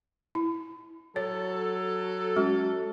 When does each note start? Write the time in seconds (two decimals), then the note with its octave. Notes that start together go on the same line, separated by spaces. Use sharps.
0.35 E4
1.16 F#3 A4 C#5
2.36 G#3 C#4 F#4